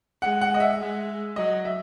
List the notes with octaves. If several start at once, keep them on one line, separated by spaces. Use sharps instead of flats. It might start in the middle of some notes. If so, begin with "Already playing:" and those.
G#3 F#5
F#5
D#5
E5
G#3
F#3 D#5
E5